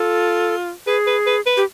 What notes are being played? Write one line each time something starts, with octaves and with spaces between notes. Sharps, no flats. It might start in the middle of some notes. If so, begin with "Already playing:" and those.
Already playing: F4 A4
G#4 B4
B4
B4
B4
G4